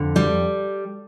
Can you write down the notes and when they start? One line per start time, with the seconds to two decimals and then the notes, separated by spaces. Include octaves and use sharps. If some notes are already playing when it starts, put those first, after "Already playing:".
Already playing: F2 D3
0.16 G3